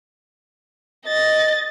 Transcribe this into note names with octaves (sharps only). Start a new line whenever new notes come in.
D#5 A6